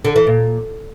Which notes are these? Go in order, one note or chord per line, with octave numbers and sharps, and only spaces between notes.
D3
E3
A#2